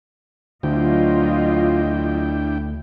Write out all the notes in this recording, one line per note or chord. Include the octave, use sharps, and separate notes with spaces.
D2 F#3 D4 E4 F4 D#5 G5